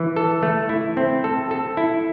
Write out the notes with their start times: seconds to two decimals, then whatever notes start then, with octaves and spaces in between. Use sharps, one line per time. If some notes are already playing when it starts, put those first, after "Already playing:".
Already playing: E3
0.16 A4
0.43 A3
0.69 E4
0.97 C4
1.24 A4
1.51 A4
1.77 E4